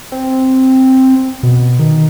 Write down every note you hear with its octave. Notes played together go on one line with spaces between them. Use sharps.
C4
B2
D#3